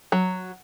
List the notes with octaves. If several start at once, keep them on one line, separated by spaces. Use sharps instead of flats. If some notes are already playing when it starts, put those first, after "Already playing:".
F#3